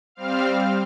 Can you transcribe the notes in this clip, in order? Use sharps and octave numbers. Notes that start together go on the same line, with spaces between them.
G3 C4 F5 F6